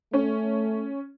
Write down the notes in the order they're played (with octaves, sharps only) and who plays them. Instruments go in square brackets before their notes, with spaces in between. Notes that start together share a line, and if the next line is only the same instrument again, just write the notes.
[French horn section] A3 [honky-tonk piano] C#4